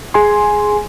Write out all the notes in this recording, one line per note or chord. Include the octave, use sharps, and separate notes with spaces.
G#4 G#5 C6